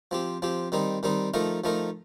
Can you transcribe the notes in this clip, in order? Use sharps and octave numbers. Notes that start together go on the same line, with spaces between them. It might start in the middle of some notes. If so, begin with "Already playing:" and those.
F3 C4 G4
F3 C4 G4
D#3 G3 C4 D#4
D#3 G3 C4 D#4
F3 A3 D#4 A#4
F3 A3 D#4 A#4